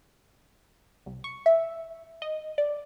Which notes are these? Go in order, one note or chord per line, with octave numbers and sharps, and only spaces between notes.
C2
C#6
E5
D#5
D5